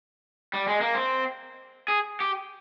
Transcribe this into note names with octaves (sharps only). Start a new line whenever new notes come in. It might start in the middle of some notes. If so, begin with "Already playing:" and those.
G3
G#3
A#3
C4
G#4
G4